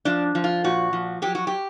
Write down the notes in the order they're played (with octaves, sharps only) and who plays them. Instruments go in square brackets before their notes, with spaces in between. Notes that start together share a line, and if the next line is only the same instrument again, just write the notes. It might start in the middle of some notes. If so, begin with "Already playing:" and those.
[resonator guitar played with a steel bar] F3 D4
F3
F4
A#2 F#4
F3
F#3 G4
F#4
G4